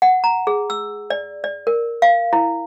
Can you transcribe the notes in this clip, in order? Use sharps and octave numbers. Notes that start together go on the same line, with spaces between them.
F#5
A#5
G#4
E6
D5
D5
A#4
F5
E4